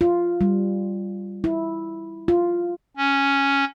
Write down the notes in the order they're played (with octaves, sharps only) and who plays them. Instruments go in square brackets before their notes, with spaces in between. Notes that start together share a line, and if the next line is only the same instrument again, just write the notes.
[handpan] F4
G3
E4
F4
[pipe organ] C#4